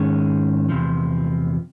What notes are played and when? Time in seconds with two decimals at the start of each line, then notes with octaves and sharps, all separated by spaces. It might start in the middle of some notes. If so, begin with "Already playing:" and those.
Already playing: G#2 D#3 G#3 C#4
0.69 E2 C3 F3